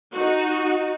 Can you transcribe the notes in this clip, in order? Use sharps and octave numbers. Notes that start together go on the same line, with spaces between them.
D#4 F#4